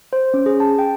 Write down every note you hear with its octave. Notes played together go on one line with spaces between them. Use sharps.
C5
C#4
G#4
A5
G5